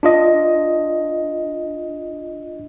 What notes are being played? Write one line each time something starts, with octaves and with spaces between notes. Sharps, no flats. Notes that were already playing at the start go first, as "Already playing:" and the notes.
D4 F4 D#5